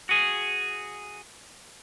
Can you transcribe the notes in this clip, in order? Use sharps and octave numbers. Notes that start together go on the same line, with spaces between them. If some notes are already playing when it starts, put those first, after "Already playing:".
F#4 G#4